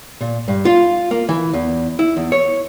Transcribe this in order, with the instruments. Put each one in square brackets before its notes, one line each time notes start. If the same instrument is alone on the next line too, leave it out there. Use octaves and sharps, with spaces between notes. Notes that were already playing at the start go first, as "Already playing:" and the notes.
[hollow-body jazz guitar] A#2
G2
F4
A#3
E3
E2
E4
E2
C#5